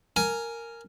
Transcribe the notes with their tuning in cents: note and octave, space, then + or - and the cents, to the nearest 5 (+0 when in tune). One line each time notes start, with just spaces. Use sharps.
A#4 -10 G#5 +10